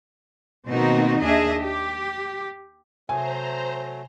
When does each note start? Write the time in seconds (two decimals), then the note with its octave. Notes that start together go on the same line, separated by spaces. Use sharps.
0.68 B2 D#3 A#3 C4 D#4 F#4
1.23 D#2 D4 G#4 D#5 E5
1.62 G4
3.09 C3 F#3 A3 C5 E5 G#5 A#5 D#6